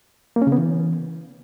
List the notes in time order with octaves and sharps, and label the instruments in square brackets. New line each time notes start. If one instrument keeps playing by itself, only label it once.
[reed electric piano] A#3
C#4
C#3
B3
E3